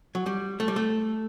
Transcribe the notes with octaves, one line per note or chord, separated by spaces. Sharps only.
F#3
G3
A3
G3
A3